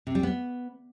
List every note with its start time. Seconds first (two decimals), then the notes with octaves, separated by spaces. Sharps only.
0.07 C3
0.15 G3
0.23 B3